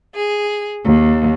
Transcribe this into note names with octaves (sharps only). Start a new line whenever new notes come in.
G#4
D#2